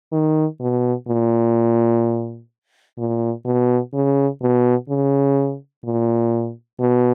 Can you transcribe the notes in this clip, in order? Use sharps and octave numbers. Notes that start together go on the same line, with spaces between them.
D#3
B2
A#2
A#2
B2
C#3
B2
C#3
A#2
B2